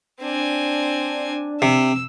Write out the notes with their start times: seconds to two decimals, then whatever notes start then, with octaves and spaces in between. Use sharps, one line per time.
0.21 C4 D4 G#5
1.62 C3 E6